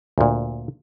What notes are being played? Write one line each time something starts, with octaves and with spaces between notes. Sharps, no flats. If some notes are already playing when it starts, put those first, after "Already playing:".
D2 A#2